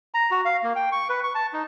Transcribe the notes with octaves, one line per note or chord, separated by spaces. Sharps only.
A#5
F#4
F5
A#3
G5
C#6
B4
C#6
A5
D#4